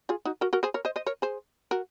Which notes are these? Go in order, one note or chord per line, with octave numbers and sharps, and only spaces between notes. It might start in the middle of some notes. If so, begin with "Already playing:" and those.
F4 G#4
D#4 F#4
F#4 A#4
F#4 A#4
G#4 C5
A#4 C#5
C5 D#5
C5 D#5
A#4 C#5
G#4 C5
F#4 A#4